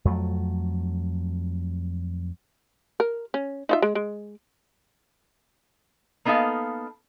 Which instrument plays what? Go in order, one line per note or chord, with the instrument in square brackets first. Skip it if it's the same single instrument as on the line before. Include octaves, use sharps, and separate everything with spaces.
[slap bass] F2 F#3 A3
[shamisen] A#4
C#4
D#4 F4 E5
G#3
G#3
[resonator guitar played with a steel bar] A#3 B3 D#4 A4 F5